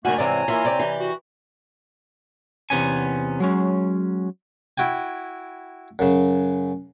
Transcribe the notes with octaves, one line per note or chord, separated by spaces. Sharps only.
G2 C3 D#3 A3 A#3 D4 F#4 G#5
G#2 C3 E3 C4 C#5 D5 G#5 A#5
E3 A#3 E4 F4
C3 C4 G4 D5
E3 G4
F#4
E2 C3 B3 C#4 G#5
F#3 G#3 C#4
E4 F#4 G5 G#5
F#2 C#3